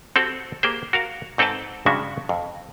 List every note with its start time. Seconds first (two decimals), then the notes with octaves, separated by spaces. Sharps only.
0.16 C4 F#4 G4 A4
0.63 A#3 G4 G#4 C5
0.93 F#4 A#4 F5
1.38 G#2 C4 A4 B4 G5 A5
1.86 G2 C#3 G#3 D4 F#4 E5
2.29 F2